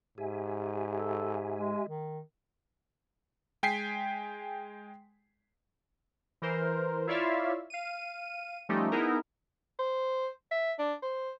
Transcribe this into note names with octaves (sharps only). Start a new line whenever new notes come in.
G#2 G4 E5 G#5
A4
G#3
D#3
G#3 G5 G#5 B6 C7
E3 A#4 C5
E4 F4 C#5 D5 E5 F5
F5 D#7
F3 G3 A3 C#4 D#4 G4
B3 D#4 E4 G#4 A#4
C5
E5
D4
C5